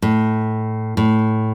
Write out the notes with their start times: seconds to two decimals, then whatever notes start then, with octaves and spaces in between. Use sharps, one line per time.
0.02 A2
0.97 A2